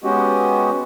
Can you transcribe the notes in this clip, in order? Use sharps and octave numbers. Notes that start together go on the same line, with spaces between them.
G#3 B3 C#4 F#4 G4 D#5